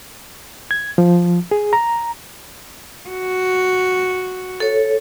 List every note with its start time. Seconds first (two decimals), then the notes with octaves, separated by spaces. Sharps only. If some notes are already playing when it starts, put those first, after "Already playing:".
0.71 G#6
0.98 F3
1.51 G#4
1.73 A#5
3.09 F#4
4.60 A4 C#5